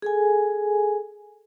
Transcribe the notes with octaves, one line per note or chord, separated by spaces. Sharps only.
G#4 A4 G#5